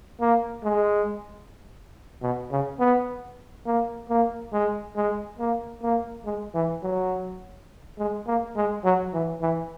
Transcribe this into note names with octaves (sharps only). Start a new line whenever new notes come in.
A#3
G#3
B2
C#3
B3
A#3
A#3
G#3
G#3
A#3
A#3
G#3
E3
F#3
G#3
A#3
G#3
F#3
E3
E3